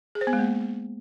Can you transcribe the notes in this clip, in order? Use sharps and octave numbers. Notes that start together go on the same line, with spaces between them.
G#4
C5
B3
G#3
A#3